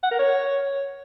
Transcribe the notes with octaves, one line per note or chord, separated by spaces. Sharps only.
F#5
A#4
C#5